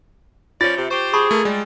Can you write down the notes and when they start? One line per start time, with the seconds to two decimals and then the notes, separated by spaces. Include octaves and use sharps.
0.61 F3 C#4 F4 D5 A6
0.77 C3
0.91 G4 C5 C#6
1.13 G#4 A5 B5 C#6
1.31 A3 A#3 A#4
1.45 G3 G#3